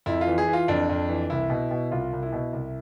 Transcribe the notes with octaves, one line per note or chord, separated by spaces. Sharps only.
F2 E4
F4
E3
G#4
E3
F4
F2 D4
F2
E3
C2 E4
B2
B2
C2 F4
C2
E4
B2
C2